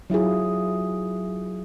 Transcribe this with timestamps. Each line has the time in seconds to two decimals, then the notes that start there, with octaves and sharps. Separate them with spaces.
0.10 F#3 E4 F4 G#4